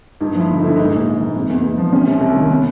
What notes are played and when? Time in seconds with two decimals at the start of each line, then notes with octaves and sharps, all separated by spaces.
0.21 G2 D#4
0.35 F3 E4
0.49 G1
0.59 D#4
0.63 D3 E4
0.76 G#2 D#4
0.92 A#1
1.06 A#1
1.21 E3
1.36 C3
1.49 E2
1.63 E2
1.78 F3
1.93 C3 C#4
2.07 C2
2.21 C2
2.36 D#3
2.51 B3